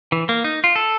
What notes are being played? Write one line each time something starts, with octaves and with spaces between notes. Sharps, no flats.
E3
A#3
D#4
F4
A4